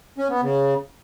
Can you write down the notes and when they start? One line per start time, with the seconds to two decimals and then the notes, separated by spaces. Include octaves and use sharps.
0.18 C#4
0.30 B3
0.42 C#3